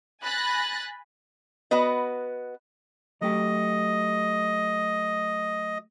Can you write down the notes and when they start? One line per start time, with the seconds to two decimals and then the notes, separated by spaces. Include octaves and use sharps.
0.23 G#5 B5 F#6 A6 A#6
1.71 B3 F#4 B4 D#5
3.21 F#3 A3 G4 D#5